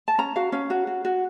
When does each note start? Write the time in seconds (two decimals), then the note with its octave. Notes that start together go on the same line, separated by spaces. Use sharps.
0.08 A5
0.18 C#4 A#5
0.36 F#4 F5
0.52 C#4 F5
0.70 F#4
0.87 F#4
1.05 F#4